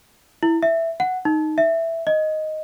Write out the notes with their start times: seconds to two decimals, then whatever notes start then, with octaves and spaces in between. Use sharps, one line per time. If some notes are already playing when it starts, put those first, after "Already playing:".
0.43 E4
0.63 E5
1.00 F#5
1.25 D#4
1.58 E5
2.07 D#5